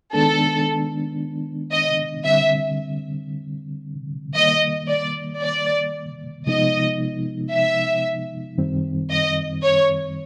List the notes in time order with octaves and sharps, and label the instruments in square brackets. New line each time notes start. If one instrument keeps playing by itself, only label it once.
[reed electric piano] D#3 G#3 B3 D4 [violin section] A4
[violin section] D#5
[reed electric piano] D3 G3 C4 [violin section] E5
[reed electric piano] D#3 G3 A#3 [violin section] D#5
[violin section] D5
D5
[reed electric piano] C3 F3 G#3 B3 D#4 [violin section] D#5
[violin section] E5
[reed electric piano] F#2 D#3 G3 C4
[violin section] D#5
C#5